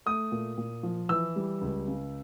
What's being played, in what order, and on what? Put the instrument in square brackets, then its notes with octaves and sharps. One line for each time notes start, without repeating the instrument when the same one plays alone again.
[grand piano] A3 D#6
A#2
A#2
F3
E3 E6
G3
C#2
C#3